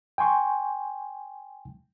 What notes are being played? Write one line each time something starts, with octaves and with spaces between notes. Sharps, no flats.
G5 G#5 C6 C#6